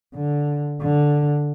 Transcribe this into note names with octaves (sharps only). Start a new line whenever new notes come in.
D3
D3